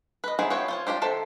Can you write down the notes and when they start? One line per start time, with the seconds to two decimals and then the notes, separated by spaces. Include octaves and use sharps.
0.24 B4 D#5
0.39 D#3 B3 E4 G#4 C5
0.50 B3 F4 C#5 E5 G5
0.68 F4 C5 C#5
0.87 D4 F4 G4 C5
1.02 D#3 A4 C5 E5 G5